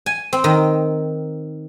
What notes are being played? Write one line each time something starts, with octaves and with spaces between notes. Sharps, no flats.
G#5
C4
D#3